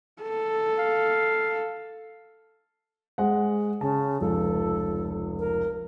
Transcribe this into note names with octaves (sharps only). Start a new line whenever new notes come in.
A4
F5
G#3 C5 F#5
C#3 A5
F1 C#2 A4
A#4